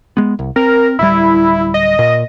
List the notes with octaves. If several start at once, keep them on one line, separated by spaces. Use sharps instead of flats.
G#3 B3
C2
C4 A#4
D1 G3 E4
D#5
A#2